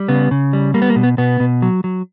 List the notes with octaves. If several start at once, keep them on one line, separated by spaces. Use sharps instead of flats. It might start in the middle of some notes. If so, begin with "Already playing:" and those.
Already playing: G3
C#3 B3
C#3
G3
G3 A#3
B3
A#3
B2
B3
B2 B3
B2
F#3
F#3